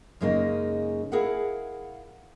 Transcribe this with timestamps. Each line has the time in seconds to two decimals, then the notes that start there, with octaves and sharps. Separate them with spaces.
0.21 F#2 C#3 G#3 A#3 D#4
1.12 E4 G#4 A#4 F5 F#5